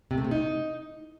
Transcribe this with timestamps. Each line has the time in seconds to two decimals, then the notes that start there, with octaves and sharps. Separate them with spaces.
0.11 C3
0.18 A3
0.24 C3
0.31 D#4